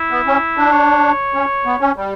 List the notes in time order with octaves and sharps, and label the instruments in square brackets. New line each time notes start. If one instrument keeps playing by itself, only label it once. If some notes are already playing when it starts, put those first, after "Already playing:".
Already playing: [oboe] E4
[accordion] B3
C#4
D4
[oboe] C#5
[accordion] C#4
B3
C#4
G3